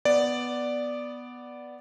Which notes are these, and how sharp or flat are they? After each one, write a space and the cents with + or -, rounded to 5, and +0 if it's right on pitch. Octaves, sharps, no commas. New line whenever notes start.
B3 +0 D5 +0